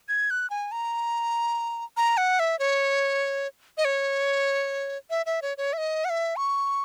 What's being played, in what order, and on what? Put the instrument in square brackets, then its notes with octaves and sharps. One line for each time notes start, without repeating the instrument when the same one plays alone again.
[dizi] G#6
F#6
G#5
A#5
A#5
F#5
E5
C#5
D#5
C#5
E5
E5
C#5
C#5
E5
D#5
F#5
E5
C#6